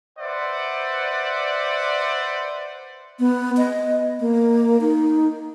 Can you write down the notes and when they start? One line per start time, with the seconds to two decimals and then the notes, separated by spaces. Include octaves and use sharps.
0.19 B4 C5 D5 E5 F#5
3.19 B3
3.57 D#5
4.20 A#3
4.81 D#4